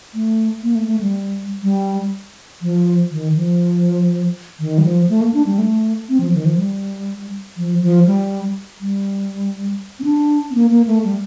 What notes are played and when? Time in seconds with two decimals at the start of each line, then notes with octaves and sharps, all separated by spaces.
0.14 A3
0.63 A#3
0.75 A3
0.88 A3
1.01 G3
1.63 G3
2.62 F3
3.11 D#3
3.36 F3
4.60 D#3
4.78 G3
4.84 F3
5.10 A3
5.21 A#3
5.34 D4
5.46 G3
5.58 A3
6.09 C4
6.20 F3
6.34 D#3
6.45 F3
6.57 G3
7.57 F3
7.82 F3
8.06 G3
8.81 G3
10.00 C4
10.04 D4
10.51 C4
10.55 A#3
10.71 A#3
10.87 A3
11.04 G3